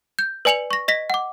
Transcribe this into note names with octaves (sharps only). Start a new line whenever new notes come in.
G6
B4 D5 G#5 C#7 F7 F#7
C#6 A#6
D#5 A#6 B6
F#5 D6